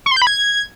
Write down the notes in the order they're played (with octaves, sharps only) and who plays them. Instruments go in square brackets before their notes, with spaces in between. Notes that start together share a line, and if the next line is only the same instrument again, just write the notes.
[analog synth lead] C#6
C6
G6
B5
G#6